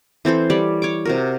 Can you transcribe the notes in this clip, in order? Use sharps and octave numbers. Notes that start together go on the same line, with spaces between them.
E3 C4 A4 C5
G3 C#5 D5
C#5 C#6 D6
C3 F#4 A#4